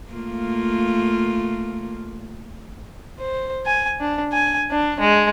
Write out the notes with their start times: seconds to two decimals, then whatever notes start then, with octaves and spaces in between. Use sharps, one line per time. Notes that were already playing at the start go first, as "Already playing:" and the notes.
0.12 A3 A#3 F4
3.19 C5
3.66 G#5
4.01 D4
4.32 G#5
4.71 D4
5.00 G#3